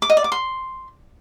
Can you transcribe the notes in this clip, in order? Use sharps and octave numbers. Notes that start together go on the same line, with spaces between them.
D6
D#5
D5
D6
C6